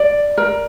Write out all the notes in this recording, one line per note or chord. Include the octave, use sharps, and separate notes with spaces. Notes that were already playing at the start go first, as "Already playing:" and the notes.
Already playing: D5
A#4